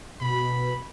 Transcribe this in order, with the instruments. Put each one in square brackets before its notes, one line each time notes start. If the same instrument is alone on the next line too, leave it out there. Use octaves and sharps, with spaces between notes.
[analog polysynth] B2 [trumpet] B5